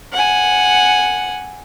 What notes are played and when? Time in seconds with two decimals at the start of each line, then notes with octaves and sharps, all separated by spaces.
0.13 F#5 G#5